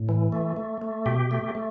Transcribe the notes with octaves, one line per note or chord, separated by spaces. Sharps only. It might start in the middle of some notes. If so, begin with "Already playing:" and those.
Already playing: A2
E3
A3
A3
A3
B2 G4
A3
A3